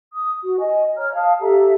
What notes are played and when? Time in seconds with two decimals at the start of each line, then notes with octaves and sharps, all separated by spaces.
0.13 D#6
0.43 F#4
0.59 D#5 G#5
0.97 C#5 A#5 F6
1.15 F5 A5 D#6
1.40 G4 A4 E5 A#5